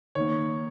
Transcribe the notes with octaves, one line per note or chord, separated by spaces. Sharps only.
D#3 A#3 C#5